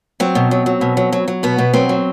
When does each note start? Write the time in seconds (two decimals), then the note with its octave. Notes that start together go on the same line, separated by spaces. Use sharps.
0.20 F#3 C4
0.35 B2
0.51 F#3
0.66 F#3
0.81 B2
0.97 F#3
1.12 F#3
1.28 F#3
1.43 B2 B3
1.58 B2
1.74 F#3 C4
1.89 F#3